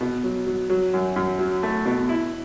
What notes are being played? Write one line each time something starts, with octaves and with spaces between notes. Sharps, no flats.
B2
F#3
F#3
F#3
F#2
F#2
F#3
A3
B2
E4